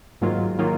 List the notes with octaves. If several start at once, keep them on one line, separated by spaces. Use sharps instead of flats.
G#2 D#3 F#3 A#3 F4
D#3 F#3 A#3 F4